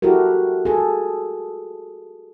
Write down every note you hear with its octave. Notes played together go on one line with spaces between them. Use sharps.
E4 F#4 G4 A4 A#4
G#4 A4